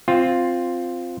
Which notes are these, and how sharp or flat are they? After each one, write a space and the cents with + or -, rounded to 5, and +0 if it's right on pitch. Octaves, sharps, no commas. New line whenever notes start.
C4 +0 F4 +0